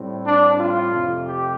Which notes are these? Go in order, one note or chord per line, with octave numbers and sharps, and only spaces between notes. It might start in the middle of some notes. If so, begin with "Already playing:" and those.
Already playing: A2 G3 C4
D4
F4
F2 C3 A3
G4